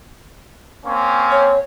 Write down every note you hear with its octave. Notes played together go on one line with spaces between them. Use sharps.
A#3 C4 C#4
C#5